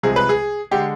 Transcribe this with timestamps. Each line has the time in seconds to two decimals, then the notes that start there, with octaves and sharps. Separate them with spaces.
0.03 C2 C3 F3 G#3 G#4
0.16 B4
0.29 G#4
0.71 D3 G#3 G4